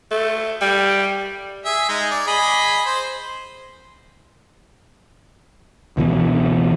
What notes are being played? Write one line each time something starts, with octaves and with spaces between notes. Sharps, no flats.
A3
G3
G#4 E5
G#3 D#4
D5
G#4 D#5 B5
C5
C#2 B2 E3